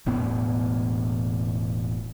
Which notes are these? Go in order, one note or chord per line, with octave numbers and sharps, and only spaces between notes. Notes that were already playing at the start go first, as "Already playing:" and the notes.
E1 A2 B3